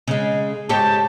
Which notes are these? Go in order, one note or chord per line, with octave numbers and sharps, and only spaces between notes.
C#3 G#3
G#2 G4 C#5 A5